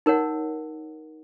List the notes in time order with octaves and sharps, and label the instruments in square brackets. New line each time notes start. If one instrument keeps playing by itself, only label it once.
[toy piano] D#4 A#4 C#5 F#5